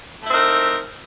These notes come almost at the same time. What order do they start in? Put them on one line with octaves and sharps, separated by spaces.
A3 E4 C4 D#4 A#4